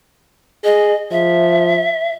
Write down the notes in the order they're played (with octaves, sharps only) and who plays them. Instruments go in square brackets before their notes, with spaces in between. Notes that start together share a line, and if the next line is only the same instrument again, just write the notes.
[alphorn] G#4 [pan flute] D#5
[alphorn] F3 [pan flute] E5